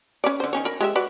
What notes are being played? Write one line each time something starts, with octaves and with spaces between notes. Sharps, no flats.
C#4 B4 D5
D3 C5
D#3 C#4 C#5
A#4 B5
G#3 G4 E5
F#4 B4 D5